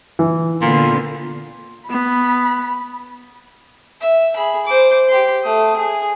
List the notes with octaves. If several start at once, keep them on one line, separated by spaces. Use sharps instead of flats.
E3
A#2 D3 B3 F4
B3 B5
E5
G#4 B5
C5 D6
G4 C6
A3 D#6
G#4